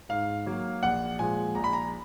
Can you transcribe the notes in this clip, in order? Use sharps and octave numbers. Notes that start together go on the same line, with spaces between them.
G#2 F5
F#3 A#3
A#1 F#5
A#2 F3 G#3 G#5
A#1 A#5
B5
A#5